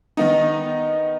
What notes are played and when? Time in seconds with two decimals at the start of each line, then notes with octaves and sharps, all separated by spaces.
0.17 D#3 B3 D#4